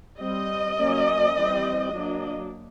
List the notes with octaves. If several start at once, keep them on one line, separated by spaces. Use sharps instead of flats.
G3 C4 D#5
F#3 A#3 C#4
E3 G3 C4
F#3 A#3 D4